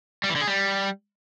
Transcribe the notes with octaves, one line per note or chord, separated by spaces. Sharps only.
G3
E3
D3
G#4
G3